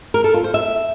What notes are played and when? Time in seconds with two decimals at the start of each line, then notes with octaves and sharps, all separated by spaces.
0.14 A#4
0.24 A4
0.34 F4
0.44 C5
0.54 E5